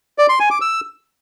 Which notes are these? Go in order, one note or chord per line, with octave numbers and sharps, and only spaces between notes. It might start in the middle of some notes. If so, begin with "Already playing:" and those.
D5
C6
G#5
D6
E6